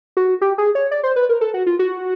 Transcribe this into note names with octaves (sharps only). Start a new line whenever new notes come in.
F#4
G4
G#4
C#5
D5
C5
B4
A#4
A4
F#4
F4
F#4